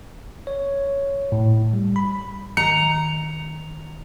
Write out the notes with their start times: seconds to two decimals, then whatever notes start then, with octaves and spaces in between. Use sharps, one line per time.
0.47 C#5
1.32 A2
1.73 G3
1.96 B5
2.57 D#3 A#5 C#7